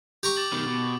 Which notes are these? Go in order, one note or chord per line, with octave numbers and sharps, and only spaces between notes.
G4 A#5 C#6
D6 A6 F#7
B2 D#3
B2